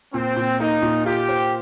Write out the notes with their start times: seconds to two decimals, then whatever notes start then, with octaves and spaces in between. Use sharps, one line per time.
0.14 A#2 C4
0.36 A#2
0.60 A#3 D#4
0.82 A#2
1.06 F4 G4
1.29 C5